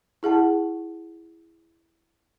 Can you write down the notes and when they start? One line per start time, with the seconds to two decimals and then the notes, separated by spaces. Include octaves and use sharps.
0.23 E4 G#4 F#5 A5